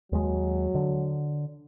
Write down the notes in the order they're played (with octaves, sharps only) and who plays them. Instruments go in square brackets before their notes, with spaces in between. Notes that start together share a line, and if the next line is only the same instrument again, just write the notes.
[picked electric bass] D#2 G#3 [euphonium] F#3
[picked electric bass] D3